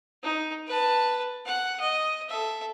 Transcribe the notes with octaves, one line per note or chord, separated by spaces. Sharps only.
D#4
B4 A5
F#5
D#5
A4 E5